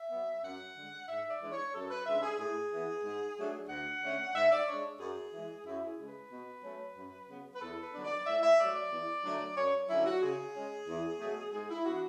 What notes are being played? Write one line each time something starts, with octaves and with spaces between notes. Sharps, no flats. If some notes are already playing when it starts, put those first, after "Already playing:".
Already playing: E5
F#3 B3
F#2 F#5
D3 G#3
G#2 E5
D5
E3 G#3 D4
C#5
F#2 A4
B4
C#3 G#3 D4 E5
G#4
A2 G#4
E3 B3
G#2
F#3 A3 D4
D2 F#5
D3 A3 C#4
G#2 E5
D5
G#3 D4 C#5
F#2 G#4
E3 G#3
F#2 E4
G#4
C#3 G#3
B4
B2
F#3 A3 C#4
F#2
C#3 F#3 B3
B4
E2 A4
B4
D3 F#3 B3 D4
D5
A2 E5
E5
F#3 A3 D5
D5
E2
D3 F#3 A3 D4
F#2 C#5
D3 F#3 C#4 E4
F#4
C#3 G#4
G#3 C#4
E2
B2 F#3 A3
G#2 G#4
E4
E3 B3 D4 F#4